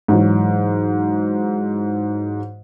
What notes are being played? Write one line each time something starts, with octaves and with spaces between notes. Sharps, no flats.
G#2 E3 F#3